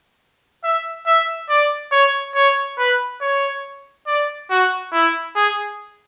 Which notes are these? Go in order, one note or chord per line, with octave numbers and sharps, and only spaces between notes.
E5
E5
D5
C#5
C#5
B4
C#5
D5
F#4
E4
G#4